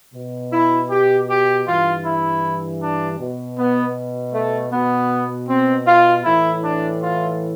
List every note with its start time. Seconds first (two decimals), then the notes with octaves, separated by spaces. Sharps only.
0.14 B2
0.53 E4
0.90 G4
1.29 G4
1.67 G2 E3 F4
2.05 E4
2.81 D4
3.19 B2
3.57 B3
4.33 A3
4.72 B2 B3
5.48 C4
5.87 F4
6.24 A2 E3 E4
6.63 D4
7.01 F4